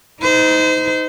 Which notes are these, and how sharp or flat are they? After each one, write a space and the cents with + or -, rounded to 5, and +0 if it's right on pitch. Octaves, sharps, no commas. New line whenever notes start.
D#4 +20 C5 -30